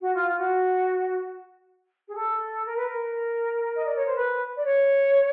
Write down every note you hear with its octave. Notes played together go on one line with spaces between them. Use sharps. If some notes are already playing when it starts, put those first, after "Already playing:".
F#4
F4
F4
F#4
G#4
A4
A#4
B4
A#4
D#5
D5
C#5
C5
B4
D5
C#5